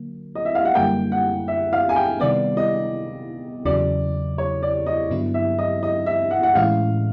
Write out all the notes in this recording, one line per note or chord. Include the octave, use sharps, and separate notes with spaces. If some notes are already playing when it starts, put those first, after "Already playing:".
Already playing: D3 F#3 A#3
D#5
E5
F5
F#5
F#2 D3 G3 A#3 G5
F#5
E5
F5
G#5
G5
C3 D#3 G3 B3 D5
D#5
E2 C#3 F#3 D5
C#5
D5
D#5
G2 D3 F#3 B3 E4
E5
D#5
D#5
E5
F#5
F#5
A2 E3 G#3 C#4 E4 F5